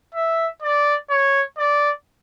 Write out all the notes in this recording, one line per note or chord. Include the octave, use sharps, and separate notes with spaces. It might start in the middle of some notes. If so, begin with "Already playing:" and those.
E5
D5
C#5
D5